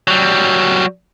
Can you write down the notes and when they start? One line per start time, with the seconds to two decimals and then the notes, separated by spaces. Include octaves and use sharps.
0.08 F#3 G3